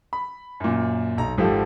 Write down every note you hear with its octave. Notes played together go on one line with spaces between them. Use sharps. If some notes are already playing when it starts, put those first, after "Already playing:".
B5
F#2 A#2
B1 A#5
G#1 F3 G4 A4